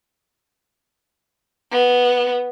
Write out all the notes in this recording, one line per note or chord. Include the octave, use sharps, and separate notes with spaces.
B3